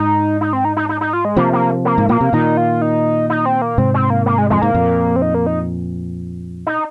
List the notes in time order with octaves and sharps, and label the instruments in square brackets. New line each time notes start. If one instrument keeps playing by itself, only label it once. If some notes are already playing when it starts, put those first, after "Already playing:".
Already playing: [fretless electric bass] G#2 [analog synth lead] D#4
[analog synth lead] D#4
C4
D#4
D#4
D#4
D#4
F4
G#3
[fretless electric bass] C3 F3 [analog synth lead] A#3
[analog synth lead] A#3
A#3
[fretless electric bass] G#2
[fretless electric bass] A#2 [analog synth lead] A#3
[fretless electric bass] C3
[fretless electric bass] A#2 D#3 [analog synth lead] D#4
[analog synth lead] F4
D#4
D#4
C4
A#3
[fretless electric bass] G#2 C3 [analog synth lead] C4
[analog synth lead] C4
A#3
A#3
G#3
[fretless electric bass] F2 [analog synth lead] G#3
[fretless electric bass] G#2 [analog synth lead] A#3
[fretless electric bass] F2 A#2
[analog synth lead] C4
D#4
A#3
D#4
D#4